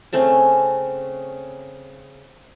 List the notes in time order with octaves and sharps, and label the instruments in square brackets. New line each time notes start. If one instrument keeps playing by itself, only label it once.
[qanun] C#3 A3 C4 C#4